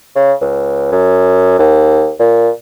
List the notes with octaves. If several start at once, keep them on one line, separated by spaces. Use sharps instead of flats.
C#3
C#2
F#2
D#2
A#2